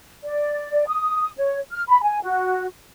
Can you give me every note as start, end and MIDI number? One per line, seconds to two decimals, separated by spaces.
0.24 0.86 74
0.87 1.30 87
1.37 1.59 73
1.71 1.82 89
1.88 2.01 83
2.02 2.21 80
2.23 2.66 66